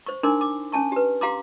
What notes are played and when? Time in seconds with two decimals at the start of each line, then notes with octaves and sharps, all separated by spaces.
0.06 C5 C#6
0.23 D4 D#4 A#4 G#5 C6 D6
0.41 D6
0.72 C#4 G#5 A5 C#6
0.92 G4 B4
1.21 G4 F5 A#5 C6 D6